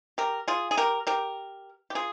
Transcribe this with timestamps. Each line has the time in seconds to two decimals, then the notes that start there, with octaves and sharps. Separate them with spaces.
0.18 G4 A#4
0.48 F4 G#4
0.71 G#4
0.77 G4 A#4
1.07 G4 A#4
1.90 G4
1.95 F4 G#4